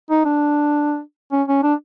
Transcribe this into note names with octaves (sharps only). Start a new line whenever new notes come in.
D#4
D4
C#4
C#4
D4